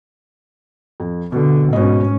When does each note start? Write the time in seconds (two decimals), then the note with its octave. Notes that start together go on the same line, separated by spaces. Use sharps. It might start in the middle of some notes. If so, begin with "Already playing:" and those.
1.00 F2
1.32 B2 D3
1.73 G#2 B2 C#4 D#5